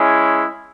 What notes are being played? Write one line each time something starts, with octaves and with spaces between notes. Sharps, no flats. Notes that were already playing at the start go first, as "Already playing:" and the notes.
Already playing: G#3 C#4 E4